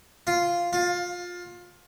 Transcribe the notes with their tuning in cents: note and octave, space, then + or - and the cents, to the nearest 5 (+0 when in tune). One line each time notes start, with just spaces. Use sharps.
F4 -5
F4 +20